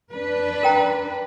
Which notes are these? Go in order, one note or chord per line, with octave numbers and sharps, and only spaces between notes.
D4 B4
A#4 G5 A#5